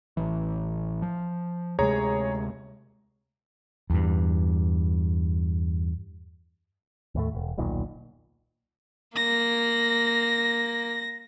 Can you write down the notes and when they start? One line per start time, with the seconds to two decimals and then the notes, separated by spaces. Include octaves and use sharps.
0.17 A1 E3
1.02 F3
1.79 D2 C3 G#3 G#4 C#5 A#5
3.90 E2 G2
7.15 D#2 A2 A3
7.35 E1
7.58 D#1 B1 A#2 D#3
9.16 A#3 A#6